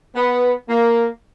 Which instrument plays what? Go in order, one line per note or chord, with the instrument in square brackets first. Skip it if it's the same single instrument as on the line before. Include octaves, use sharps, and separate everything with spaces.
[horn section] B3
A#3